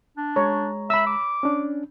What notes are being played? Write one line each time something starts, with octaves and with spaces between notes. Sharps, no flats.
D4
G#3 C#5 A#5
E5 B5 E6
D6
C#4 D4